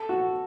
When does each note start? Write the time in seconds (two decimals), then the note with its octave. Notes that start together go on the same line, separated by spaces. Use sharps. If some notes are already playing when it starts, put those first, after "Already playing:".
Already playing: A4
0.09 F#4